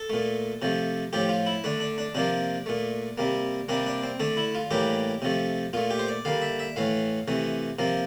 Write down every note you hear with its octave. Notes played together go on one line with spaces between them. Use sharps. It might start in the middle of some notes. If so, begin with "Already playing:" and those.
Already playing: A4
A#2 A3
C3 F3 A3
A2 F3 A3 G4
F4
E4
D3 A3 D4
D4
D4
C3 F3 A#3 D4
A#2 A3
C3 G3 A#3
C3 G3 A#3 D4
D4
C4
D3 A3 D4
E4
F4
A2 E3 G3 A#3 G4
C3 F3 A3
A#2 A3 F4
G4
C5
D5
D3 G3 A#3 F5
E5
E5
A2 E3 A3 F5
C3 E3 A3
C3 F3 A#3